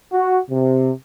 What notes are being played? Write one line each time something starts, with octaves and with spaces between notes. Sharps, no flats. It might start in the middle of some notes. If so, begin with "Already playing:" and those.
F#4
C3